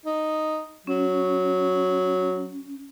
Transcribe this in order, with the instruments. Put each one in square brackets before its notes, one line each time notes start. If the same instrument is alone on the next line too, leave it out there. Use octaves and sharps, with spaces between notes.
[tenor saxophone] D#4
[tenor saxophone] F#3 [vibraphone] C#4